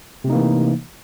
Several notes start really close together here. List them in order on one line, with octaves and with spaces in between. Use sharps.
C3 A3 D#4 A#3 E3